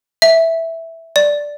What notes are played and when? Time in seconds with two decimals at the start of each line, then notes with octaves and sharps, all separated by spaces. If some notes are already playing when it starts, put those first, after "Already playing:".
0.22 E5
1.16 D5